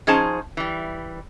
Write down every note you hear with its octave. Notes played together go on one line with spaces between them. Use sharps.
F3 C#4 D#4 G#4 C5 A5
E3 G3